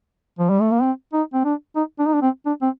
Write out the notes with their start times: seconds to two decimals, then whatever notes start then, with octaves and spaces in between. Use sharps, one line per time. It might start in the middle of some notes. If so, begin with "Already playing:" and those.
0.39 F3
0.50 G3
0.61 A3
0.71 A#3
0.82 C4
1.13 D#4
1.34 C4
1.45 D4
1.76 D#4
1.99 D4
2.06 D#4
2.14 D4
2.22 C4
2.46 D4
2.62 C4